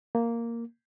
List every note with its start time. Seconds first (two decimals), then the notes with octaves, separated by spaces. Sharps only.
0.15 A#3